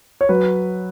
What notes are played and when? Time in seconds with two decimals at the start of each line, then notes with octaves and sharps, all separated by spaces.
0.21 C#5
0.29 F#3 B4